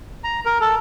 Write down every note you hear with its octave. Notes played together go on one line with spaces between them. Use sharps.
A#5
A#4
A4